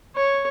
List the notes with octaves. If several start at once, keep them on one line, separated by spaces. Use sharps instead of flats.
C#5